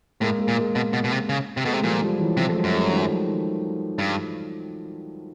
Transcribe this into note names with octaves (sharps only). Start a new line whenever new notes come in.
A2 G#3 A#3
G#3 A#3
A#2
G#3 A#3
B2
B2
B2
C3
C#3
C3
B2 A3
C3 G#3
A#2 F3 G3
F3 G3
E3 F#3
C3 F3 G3
A3
F#3 G#3
F#2
G3 A3
F#3
D#3 F3
D#3
G2